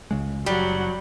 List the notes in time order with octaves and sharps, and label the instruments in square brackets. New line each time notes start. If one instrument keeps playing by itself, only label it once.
[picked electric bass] C#2 C#3 G#3
[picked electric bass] F#1 [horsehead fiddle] F#3 F#5 [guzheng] G3